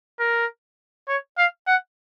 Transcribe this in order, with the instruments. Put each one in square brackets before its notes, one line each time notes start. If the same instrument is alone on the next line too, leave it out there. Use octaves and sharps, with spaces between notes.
[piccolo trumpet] A#4
C#5
F5
F#5